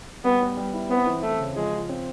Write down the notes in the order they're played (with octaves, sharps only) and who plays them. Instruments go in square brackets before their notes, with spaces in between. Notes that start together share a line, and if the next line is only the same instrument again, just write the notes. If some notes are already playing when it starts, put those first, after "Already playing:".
[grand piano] G3 [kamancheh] B3
[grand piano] B3
G3
E4
[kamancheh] B3 [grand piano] C4
[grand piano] E3
[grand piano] E3 [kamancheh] A3
[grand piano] C#3
[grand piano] F3 [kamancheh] G#3
[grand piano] F4
C4